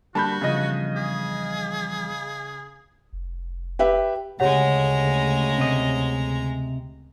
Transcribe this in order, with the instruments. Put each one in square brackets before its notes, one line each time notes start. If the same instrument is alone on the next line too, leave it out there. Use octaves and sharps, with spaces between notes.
[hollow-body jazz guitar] D3 G3 A#3 [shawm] F#4 [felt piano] A5 B5 G6
[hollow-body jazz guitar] E2 G2 F3 [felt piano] C#3 D#5
[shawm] G#4
[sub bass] F1
[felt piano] G4 B4 E5
[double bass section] D2 C#3 [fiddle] G#3 A#5 [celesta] G4 C#5 F#5
[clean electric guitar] C3 D#5